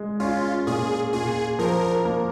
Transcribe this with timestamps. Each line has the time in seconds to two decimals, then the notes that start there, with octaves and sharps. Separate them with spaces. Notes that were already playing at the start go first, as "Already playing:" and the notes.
Already playing: G#3
0.20 C#4 F4
0.67 A#2 G#4
1.13 A#2 G#4
1.59 F3 A#4
2.05 A#3